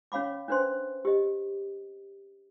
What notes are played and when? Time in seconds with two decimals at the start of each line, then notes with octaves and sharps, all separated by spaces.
0.12 C#4 C#5 F5 B5 D6
0.48 C#4 D4 B4 C5 C6
1.05 G4 D#5